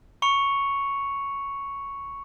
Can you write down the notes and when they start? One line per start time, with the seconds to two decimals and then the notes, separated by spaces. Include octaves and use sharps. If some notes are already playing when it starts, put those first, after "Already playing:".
0.22 B5 C#6 C#7 F7